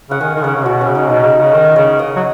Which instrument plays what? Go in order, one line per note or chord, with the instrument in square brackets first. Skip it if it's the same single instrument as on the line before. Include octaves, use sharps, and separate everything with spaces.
[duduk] C#3 [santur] F#5
[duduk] D#3 [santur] G#5
[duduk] D#3
[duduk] C#3 [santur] C#5
[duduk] C#3
[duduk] B2 [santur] F#4
[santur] C#4
[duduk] C#3
[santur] D#4
[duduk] B2 [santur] D#4
[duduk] C#3 [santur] D#4
[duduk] C#3 [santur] F#5
[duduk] D#3 [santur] F#5
[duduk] C#3 [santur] C#5
[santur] D#5
[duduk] F#3